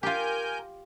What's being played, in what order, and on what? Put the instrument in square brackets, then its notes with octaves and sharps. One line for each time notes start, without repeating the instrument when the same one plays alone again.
[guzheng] F4 G4 [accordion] A#4 G#5 G6